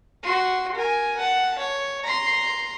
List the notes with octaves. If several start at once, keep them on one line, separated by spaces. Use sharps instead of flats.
F#4 C6
A#4 G#5
F#5 A5
C#5
A#5 C6